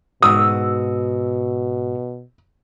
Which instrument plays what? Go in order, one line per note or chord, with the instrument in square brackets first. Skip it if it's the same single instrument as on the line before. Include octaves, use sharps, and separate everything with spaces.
[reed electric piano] G#2 F#4 [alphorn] B2 [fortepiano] D#6 [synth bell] E6